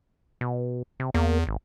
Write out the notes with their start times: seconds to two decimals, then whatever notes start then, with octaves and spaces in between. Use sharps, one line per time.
0.41 B2
1.00 C3
1.14 E2 A#3
1.47 G#1